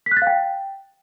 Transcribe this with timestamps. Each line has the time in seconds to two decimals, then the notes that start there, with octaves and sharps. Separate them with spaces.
0.06 B6
0.11 F#6
0.17 A6
0.22 F5
0.27 G5